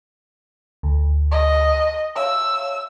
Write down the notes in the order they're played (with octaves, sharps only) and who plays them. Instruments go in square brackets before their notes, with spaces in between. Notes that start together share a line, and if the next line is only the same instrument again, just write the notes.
[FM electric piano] D2
[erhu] D#5
[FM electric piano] C#5 E5 F5 [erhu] E6